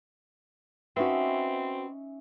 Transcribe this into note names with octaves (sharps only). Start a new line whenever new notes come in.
C4 C#4 D#4 F#4 B4 E5